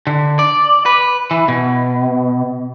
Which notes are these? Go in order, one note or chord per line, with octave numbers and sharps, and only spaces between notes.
D3
D5
B4
E3
B2